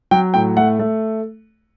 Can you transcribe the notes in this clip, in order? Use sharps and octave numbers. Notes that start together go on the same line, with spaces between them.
F#3 G5
A2 G5
A3 F#5
A3